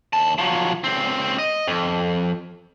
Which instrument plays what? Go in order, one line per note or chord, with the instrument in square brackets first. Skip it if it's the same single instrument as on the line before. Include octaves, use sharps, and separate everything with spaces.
[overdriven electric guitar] D#2 A5
F3 F#3
C#2 C4
D#5
F2